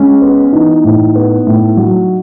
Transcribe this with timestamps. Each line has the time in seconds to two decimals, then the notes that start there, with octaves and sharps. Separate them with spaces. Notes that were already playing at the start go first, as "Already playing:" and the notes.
Already playing: G#3 C#4
0.22 B3
0.53 E3 D#4
0.84 A2
1.15 B3
1.46 A2
1.77 F#3